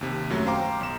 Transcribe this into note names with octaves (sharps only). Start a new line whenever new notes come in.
D#2 C3
F#2 F#3 A3
C5 F5 G5 A#5 C6 D6
B1 E7